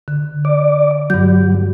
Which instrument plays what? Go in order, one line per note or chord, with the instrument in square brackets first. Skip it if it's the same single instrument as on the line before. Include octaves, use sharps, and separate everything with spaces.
[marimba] D3
[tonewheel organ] D5
[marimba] G2 G6 [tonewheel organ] F#3